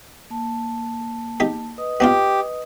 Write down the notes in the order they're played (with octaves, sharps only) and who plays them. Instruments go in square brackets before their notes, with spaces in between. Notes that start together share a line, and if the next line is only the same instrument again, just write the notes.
[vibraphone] A#3 A5
[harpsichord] D#4 G4
[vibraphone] B4 D#5 D#6
[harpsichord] B3 D4 F4 [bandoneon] G4